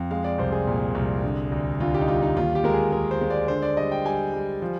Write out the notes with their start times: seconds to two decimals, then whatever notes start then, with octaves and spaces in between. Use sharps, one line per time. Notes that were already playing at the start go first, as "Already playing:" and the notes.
Already playing: F2
0.11 G#3 F5
0.24 D5
0.38 C2 C5
0.52 G#4
0.67 A#2
0.95 C2
1.23 D3
1.52 D2
1.80 D2 F4
1.94 G4
2.01 D#4
2.08 G3 F4
2.23 D#4
2.36 D#2 F4
2.55 G4
2.64 G#3 A#4
2.74 G#4
2.92 G#3 A#4
3.11 C5
3.21 G#3
3.30 D5
3.48 D3 C5
3.62 D5
3.77 G3 D#5
3.92 G5
4.05 G3 G#5
4.33 G3
4.62 F3